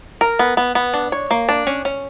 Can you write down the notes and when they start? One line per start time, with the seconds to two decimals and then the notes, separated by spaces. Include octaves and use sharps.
0.21 A#4
0.39 B3
0.57 B3
0.75 B3
0.94 D4
1.12 C#5
1.31 A#3
1.49 D4
1.67 C#4
1.85 C#4